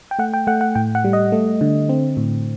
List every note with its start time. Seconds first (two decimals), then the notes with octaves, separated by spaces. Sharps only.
0.11 G5
0.19 A3 F#5
0.34 G5
0.47 A3 F#5
0.61 F#5
0.75 A2 G5
0.95 F#5
1.04 G3
1.13 D#5
1.32 A3
1.61 D3
1.89 C4
2.17 A2